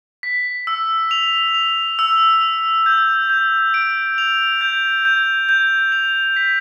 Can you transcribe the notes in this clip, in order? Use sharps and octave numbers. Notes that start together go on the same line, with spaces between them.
B6
E6
F7
F7
E6
F7
G6
G6
D7
F7
G6
G6
G6
F7
B6